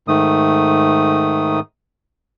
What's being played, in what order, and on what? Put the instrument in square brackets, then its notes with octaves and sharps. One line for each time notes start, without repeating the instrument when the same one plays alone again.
[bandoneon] G#2 D#3 A3 D#6